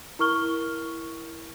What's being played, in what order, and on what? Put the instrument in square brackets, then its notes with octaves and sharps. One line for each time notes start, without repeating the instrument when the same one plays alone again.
[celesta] E4 A#4 C#6 F6 G7